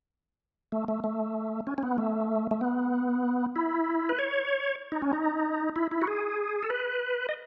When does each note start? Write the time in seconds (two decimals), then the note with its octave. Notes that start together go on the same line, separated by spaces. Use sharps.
0.72 A3
0.88 A3
1.04 A3
1.67 C#4
1.78 C#4
1.83 B3
1.98 A3
2.51 A3
2.61 B3
3.56 E4
4.09 B4
4.19 C#5
4.92 D#4
5.02 C#4
5.13 D#4
5.76 E4
5.91 E4
6.02 F#4
6.07 G#4
6.63 A4
6.70 B4
7.29 D#5